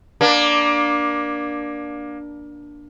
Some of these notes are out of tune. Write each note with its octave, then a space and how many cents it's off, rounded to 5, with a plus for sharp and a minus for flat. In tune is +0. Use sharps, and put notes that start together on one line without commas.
A#3 +25 D4 +0